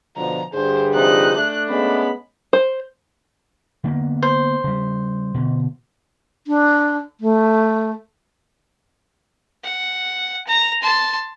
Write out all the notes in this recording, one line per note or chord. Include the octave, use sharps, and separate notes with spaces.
B2 D3 F3 A#5
G2 D3 G#4 C5
C3 F3 D#4 F#6
A3 D4
G#3 B3 C#4 B5
C5
D3 A#3 B3
C5
C#3 G3
B2 D3
D4
A3
F#5
A#5
A5 C6